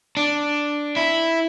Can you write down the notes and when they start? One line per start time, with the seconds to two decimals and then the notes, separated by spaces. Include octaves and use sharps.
0.17 D4
0.96 E4